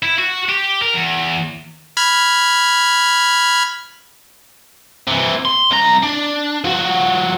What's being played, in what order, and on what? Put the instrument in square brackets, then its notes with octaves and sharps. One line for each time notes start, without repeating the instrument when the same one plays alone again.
[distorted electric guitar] E4
F#4
G4
A#4
E2
[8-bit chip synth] B5 F6 G#6
[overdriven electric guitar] C3 E3
C6
C2 A#5
D4
F3 F#4